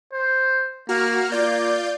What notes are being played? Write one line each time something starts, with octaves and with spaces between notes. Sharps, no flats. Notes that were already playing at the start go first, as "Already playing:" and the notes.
C5
A#3 F#4 A#5 F6
A#3 F4 D5 G6